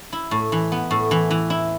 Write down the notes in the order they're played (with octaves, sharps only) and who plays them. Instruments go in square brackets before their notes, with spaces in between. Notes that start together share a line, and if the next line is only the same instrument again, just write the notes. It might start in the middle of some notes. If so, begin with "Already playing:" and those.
[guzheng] E4
A2
E3
B3
A2
E3
E3
E4